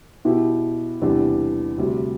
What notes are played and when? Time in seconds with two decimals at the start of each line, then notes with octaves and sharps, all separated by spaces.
0.25 B2 B3 E4 G4
1.02 E2 C3 G3 D4 G4
1.78 D2 C3 G3